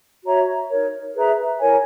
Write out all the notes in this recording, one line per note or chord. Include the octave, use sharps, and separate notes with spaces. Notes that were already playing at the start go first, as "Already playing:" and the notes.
F#4 C#5 E5 A#5
D#4 A#4 C#5
G#4 B4 E5 A#5
E4 A#4 C#5 G#5